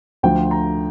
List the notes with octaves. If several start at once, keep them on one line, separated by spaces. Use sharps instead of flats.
D2 D3 F3 G5
A#5